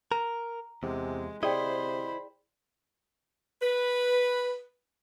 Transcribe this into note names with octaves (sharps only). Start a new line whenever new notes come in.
A#4 A#5
E2 C3 G#3
C3 E4 G#4 C5 D5 D#5 G5 B5
B4